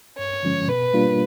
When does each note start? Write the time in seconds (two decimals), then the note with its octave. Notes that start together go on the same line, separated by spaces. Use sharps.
0.18 G2 C#5
0.43 D3 F3 G#3 C#4
0.68 B2 B4
0.94 G3 A#3 D4 F4